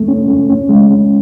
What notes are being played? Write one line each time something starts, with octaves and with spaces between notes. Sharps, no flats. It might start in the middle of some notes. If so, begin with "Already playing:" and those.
Already playing: A3
C#4
A3
C#4
G#3
C#4